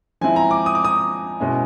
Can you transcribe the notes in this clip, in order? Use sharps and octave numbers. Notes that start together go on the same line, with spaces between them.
F3 G#3 C4 E4 G#5
A#5
D6
D#6
D6
D#6
B2 G#3 C#4 E4